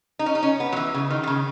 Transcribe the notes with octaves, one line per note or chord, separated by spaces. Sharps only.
D#4
C#4
D#4
C#4
B3
F#3
E3
C#3
D#3
D#3
C#3